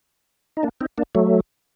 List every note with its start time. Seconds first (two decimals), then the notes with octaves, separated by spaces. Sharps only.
0.57 D#4
0.63 A#3 D4
0.81 C4 D#4
0.98 A#3 D4
1.15 F#3 A3